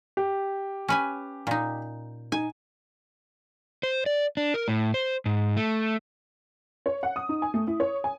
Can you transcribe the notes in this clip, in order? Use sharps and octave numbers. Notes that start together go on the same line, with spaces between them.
G4
C#4 B4 G#5
A#2 D#4
D#4 G#5
C5
D5
D4
A#4
A2
C5
G#2
A3
C#5
F#5
D#6
D#4
G#5
A3
E4
C#5
G#5